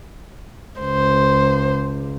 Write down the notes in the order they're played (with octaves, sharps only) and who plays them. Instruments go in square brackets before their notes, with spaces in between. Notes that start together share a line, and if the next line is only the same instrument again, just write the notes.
[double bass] C#2 [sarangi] C5